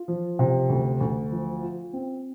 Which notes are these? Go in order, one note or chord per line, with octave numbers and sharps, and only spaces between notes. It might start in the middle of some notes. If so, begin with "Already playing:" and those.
Already playing: F4
F3
C3
D2
D2
F3
F4
C4